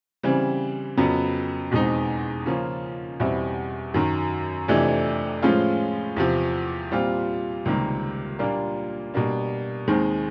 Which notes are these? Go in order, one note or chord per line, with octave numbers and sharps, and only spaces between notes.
C#3 E3 G3 C4
F2 C#3 F#3 B3
E2 B2 G#3 C4 D#4
C#3 F3 A#3 C#4 F4
E2 B2 G3 C4 E4
F#2 D#3 F#3
F2 C3 E3 A3 D4
A2 F3 G#3 C#4 F4
E2 C3 F3
A#2 G3 C4 F4
C#2 C3 D#3 G3 A#3
A#2 G3 A#3 D4 F4
B2 G3 A#3 D4
D#2 D#3 G#3 C4